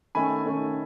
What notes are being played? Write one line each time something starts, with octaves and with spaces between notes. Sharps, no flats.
D#3 A3 C#4 G#5 B5
D#3 A3 C#4